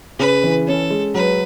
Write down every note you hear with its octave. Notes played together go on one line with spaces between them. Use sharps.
C#3 B4
E3
C#4 A4
G#3
F#3 B4